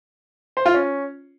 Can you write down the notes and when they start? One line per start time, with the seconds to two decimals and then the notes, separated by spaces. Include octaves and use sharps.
0.57 C5
0.66 F4
0.74 C#4